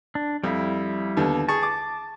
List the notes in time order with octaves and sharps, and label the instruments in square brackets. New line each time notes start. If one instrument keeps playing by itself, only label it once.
[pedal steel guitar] D4
[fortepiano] F2 [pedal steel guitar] G3 E4
[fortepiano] D#2 D3 B3
[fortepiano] G#4 C#6 [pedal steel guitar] A5
[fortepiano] D6